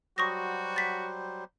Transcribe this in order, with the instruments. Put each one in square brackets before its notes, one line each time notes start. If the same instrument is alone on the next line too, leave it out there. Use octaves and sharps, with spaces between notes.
[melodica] F#3 G3 C5 [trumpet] F#4 [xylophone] C#6 D#6 A#6
[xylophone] A6 B6